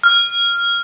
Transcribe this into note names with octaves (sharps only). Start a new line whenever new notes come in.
F6